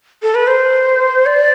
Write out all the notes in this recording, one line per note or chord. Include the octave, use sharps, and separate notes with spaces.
A4
B4
C5
D5